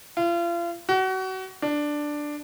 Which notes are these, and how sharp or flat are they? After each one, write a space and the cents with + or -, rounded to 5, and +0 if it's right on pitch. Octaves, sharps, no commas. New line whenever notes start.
F4 -35
F#4 +30
D4 +5